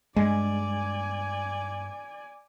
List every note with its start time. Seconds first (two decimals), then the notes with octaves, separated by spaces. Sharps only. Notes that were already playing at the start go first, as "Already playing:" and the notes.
0.16 G2 G#3 D5 G#5